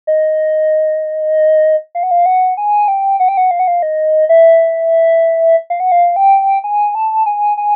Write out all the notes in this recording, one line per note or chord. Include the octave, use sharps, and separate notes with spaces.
D#5
F5
F#5
F5
F#5
G#5
G5
F#5
G5
F#5
F5
F#5
F5
D#5
E5
F5
F#5
F5
G5
G#5
A5
G#5
G#5